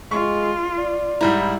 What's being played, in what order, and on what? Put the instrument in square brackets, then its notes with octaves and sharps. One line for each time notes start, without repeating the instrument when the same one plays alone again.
[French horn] G#3 [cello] F4 [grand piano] C#6
[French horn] D5
[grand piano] G#2 G3 A#5 [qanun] E4